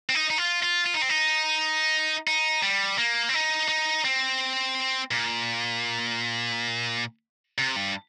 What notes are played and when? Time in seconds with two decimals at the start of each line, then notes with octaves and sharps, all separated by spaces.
0.10 C4
0.15 D#4
0.30 D#4
0.38 F4
0.63 F4
0.86 F4
0.94 D#4
1.02 C4
1.09 D#4
2.27 D#4
2.63 G3
2.98 A#3
3.29 C4
3.34 D#4
3.69 D#4
4.05 C4
5.11 A#2
7.58 C3
7.76 G2